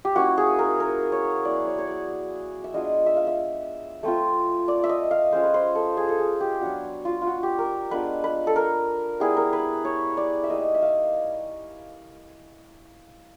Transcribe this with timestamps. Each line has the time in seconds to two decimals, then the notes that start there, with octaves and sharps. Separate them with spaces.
0.05 G4
0.15 A#3 C#4 E4 F#4
0.38 G#4
0.59 A#4
0.80 A#4
1.12 C#5
1.45 F#3 B3 E4 D5
1.66 C#5
1.79 C#5
1.87 D5
2.64 E5
2.74 G#3 B3 D4 F4 D#5
3.06 E5
3.17 F5
3.27 E5
4.03 A3 C4 F4
4.68 D5
4.84 E5
4.89 D#5
5.11 F5
5.32 G#3 C#4 F4 C5
5.43 B4
5.54 C5
5.75 A4
5.97 G#4
6.09 A4
6.19 G#4
6.41 G4
6.61 F#3 B3 D4 F#4
7.05 F4
7.22 F4
7.27 F#4
7.43 G4
7.58 A#4
7.91 G#3 B3 D4 F4 B4
8.24 B4
8.47 A4
8.56 A#4
9.20 G3 B3 E4 G#4
9.37 A#4
9.53 B4
9.85 C#5
10.17 D5
10.44 E5
10.49 G3 A#3 D#4 D#5
10.74 E5
10.82 F5